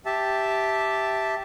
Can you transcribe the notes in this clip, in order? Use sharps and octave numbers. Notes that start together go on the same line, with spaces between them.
G4 E5 A5